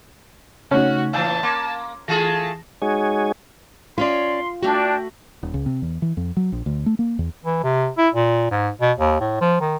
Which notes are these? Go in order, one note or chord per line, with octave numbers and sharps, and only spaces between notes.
C#3 A3 C#4 D#4 F#4
A2 E3 F5 A5 E6 G6
A#3 C6 D6
E3 A3 F4 G#4 A5 A#6
G#3 D#4 F#4 G#4 C#5 G#5
C#4 F4 C#5 D5 C6
A3 D4 F#4 G5
D#1
C#2
C3
E2
E3
F2
F#3
A#1
D2
A3
A#3
E2
E3
C3
E4
A#2
G#2
B2
D#2
A2
F3
D#3